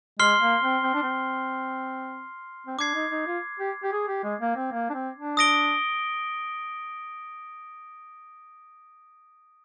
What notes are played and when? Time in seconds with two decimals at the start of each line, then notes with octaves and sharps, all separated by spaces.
0.19 G#3 C6 F6 C7 G7
0.41 A#3
0.63 C4
0.84 C4
0.94 D4
1.03 C4
2.67 C4
2.79 D4 D6 G#6 C7
2.95 D#4
3.11 D#4
3.27 F4
3.60 G4
3.84 G4
3.92 G#4
4.08 G4
4.24 G#3
4.41 A#3
4.57 C4
4.73 A#3
4.90 D4
4.94 C4
5.16 D4
5.37 D#6 A#6 D7 G7